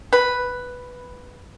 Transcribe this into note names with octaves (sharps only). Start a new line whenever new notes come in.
B4